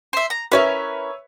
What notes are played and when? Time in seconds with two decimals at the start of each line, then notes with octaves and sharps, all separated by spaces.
0.13 C5 E5
0.30 A#5
0.52 C#4 E4 A#4 B4 C#5 E5